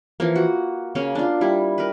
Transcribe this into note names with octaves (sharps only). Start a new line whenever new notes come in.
E3 F3 A#3
F#4
C#3 A#3 C#4
D4 F4
G3 E4
A#4 B4